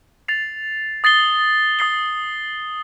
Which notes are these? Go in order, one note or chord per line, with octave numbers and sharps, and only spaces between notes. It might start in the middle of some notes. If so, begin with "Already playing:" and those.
A6 C7 F7
D#6 A6 C7 G7
D#6 A6 C7 G7